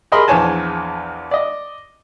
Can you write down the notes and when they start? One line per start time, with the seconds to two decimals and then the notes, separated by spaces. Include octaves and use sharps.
0.12 G4 G#4 A#4 D#5 B5 C6
0.28 A#1 E2 C5 C#5 G#5 A5
1.31 D5 D#5